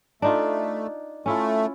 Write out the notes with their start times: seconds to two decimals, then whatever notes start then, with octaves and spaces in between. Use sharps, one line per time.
0.22 A3 D4 D#4 F4
1.26 A3 C#4 E4 F4